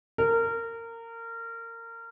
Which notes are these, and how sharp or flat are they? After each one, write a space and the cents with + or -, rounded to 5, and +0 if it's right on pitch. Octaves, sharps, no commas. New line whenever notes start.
A#4 -25